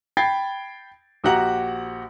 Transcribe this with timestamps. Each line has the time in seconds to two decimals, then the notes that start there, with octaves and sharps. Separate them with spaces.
0.17 G5 B5 G#6 A6 C7
1.24 A#1 F#4 G4 F#5 A#5 F#7